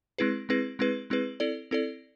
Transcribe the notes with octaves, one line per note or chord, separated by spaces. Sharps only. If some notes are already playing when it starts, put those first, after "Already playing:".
G#3 C4 E4 G#4 B4
G#3 C4 E4 G#4 B4
G#3 C4 E4 G#4 B4
G#3 C4 E4 G#4 B4
C4 E4 A4 D5
C4 E4 A4 D5